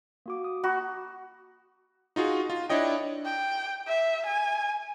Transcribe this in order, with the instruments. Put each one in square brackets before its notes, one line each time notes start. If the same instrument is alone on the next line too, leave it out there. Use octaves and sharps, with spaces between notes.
[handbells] A#3 F#4 D6
D#6
[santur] F#4 [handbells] A#5 B5 C#6
[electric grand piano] D#4 F4 F#4 G#4
F4
D4 E4 C#5 D#5 G5
[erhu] G5
E5
G#5